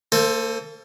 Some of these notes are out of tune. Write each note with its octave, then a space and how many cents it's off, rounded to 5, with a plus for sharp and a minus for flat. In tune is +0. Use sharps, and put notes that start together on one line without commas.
A#3 -40 A4 +0 C5 +0